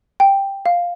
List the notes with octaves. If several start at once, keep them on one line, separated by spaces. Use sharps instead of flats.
G5
F5